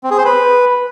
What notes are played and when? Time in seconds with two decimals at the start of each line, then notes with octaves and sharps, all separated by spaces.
0.03 C4
0.11 G#4
0.18 C5
0.25 B4